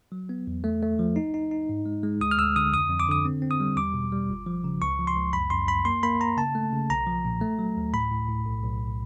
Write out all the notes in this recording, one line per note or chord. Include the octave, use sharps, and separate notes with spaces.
F#3
B3
E2
A3
A3
F3
D#4
D#4
D#4
G#2
G#3
G#3
D2 D#6
F6
D2 E6
D3 D#6
F2 D#6
F2
D6
D3 D#6
C4
C4
D#6
G3
E2 D6
B2
G3
G1
F3
C#3
C#2 C#6
F3
C6
C#2
F#2 B5
F#2 C6
F#2 B5
A#3 C6
A#3 B5
A#3 A#5
C#3 A5
A3
C#3
B1 A#5
F3
A#2
A3
F#3
D2
A2 B5
A2
A2
B1
B1